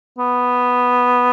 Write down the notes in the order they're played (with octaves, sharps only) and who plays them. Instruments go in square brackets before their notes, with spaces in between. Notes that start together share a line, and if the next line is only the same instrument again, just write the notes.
[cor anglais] B3